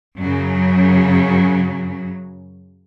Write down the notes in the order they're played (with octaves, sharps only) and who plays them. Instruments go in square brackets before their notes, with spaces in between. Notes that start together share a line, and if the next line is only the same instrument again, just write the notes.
[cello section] F#2 C#3 F#3